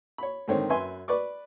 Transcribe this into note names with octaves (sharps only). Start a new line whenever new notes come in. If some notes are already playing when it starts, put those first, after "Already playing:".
C#5 B5
G#2 D3 D#3 C4 C#5
F#2 B4 E5 G#5 C6
B4 D5 C#6 D6